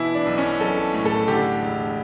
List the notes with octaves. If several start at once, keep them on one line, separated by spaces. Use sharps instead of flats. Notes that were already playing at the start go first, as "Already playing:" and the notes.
Already playing: B2 E3 E4
D4
B1
C#4
B1 A4
A2
A4
D3 G4
E1